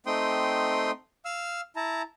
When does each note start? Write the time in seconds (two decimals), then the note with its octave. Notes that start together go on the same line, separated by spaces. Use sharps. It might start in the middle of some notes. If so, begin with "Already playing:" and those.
0.06 A3 C4 D#4 G5 C6 D#6
1.25 F5 E6 F6
1.76 E4 A5 A#5